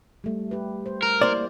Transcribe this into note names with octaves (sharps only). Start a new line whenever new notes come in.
G3 A3
G4 B4
C5
A#4
A#3 E4 C5 D5